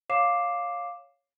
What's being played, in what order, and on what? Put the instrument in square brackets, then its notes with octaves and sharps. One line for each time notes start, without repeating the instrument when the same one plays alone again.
[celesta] C#5 F5 D6 C7 E7